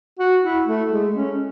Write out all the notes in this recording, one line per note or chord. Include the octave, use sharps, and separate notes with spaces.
F#4
E4
A3
G#3
C#4